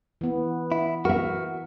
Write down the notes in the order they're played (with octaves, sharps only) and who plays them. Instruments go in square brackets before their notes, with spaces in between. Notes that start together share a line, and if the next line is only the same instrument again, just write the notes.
[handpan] E3 B3
[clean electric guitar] E4
[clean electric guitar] F#4 [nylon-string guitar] A#4 E5